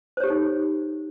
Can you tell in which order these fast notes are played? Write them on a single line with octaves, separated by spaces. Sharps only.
C5 C#5 G4 A4 D#4